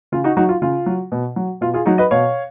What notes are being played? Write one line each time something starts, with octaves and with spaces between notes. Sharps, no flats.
C#3 F4
D#4 F#4
F#3 D#4 F#4
F4
C#3 F4
F#3
B2
F#3
B2 F4
F4 G#4
F#3 D#4 F#4
B4 D#5
B2 C#5 F5